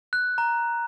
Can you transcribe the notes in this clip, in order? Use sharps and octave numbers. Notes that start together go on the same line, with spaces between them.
F#6
A#5